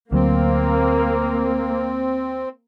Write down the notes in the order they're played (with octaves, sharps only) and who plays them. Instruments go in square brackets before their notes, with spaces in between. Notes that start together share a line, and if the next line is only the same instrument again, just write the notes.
[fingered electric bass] D2 F#3 [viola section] A#3 [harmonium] C4